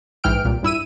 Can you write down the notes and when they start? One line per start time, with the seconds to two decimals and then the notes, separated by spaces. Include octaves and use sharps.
0.24 A#1 G#2 E3 G5 F6 D7
0.45 C2 A#2
0.63 G2 E4 E6 D#7